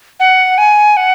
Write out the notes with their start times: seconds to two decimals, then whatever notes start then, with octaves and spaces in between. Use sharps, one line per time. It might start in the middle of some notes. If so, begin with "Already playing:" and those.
0.20 F#5
0.58 G#5
0.97 F#5